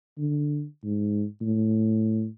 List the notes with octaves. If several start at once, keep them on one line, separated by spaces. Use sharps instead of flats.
D3
G#2
A2